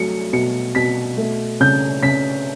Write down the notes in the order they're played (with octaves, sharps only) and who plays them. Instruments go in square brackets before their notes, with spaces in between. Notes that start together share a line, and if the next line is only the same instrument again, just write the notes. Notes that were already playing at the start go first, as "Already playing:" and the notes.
Already playing: [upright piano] F#3 A3 C#7
B2 C#7
B2 B6
A3
C#3 G6
C#3 B6